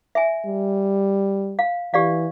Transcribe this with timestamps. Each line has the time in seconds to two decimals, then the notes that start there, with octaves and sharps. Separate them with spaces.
0.15 E5 G#5
0.46 G3
1.59 F5
1.94 E3 G4 D5 F5